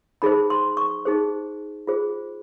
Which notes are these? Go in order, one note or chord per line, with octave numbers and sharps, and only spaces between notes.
D#4 G#4 C5 B5
C6
C#6
D#4 G#4 C5
F4 G#4 C5